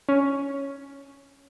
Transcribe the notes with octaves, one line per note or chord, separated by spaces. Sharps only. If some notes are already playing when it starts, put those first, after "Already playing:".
C#4